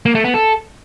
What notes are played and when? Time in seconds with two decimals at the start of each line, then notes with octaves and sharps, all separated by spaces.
0.06 A#3
0.15 A3
0.24 B3
0.34 A4